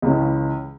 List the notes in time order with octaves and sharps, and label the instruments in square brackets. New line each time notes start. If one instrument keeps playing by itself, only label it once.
[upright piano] C#2 C#3 E3 G#3 C#4